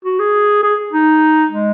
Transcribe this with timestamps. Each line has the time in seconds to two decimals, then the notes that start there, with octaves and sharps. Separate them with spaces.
0.05 F#4
0.19 G#4
0.63 G#4
0.93 D#4
1.51 G#3